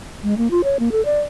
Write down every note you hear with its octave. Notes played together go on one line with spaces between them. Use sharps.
G#3
A#3
F4
C#5
A#3
A4
D5